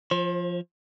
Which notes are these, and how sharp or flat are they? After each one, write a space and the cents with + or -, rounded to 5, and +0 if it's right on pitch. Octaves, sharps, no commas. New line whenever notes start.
F3 +0 C5 +40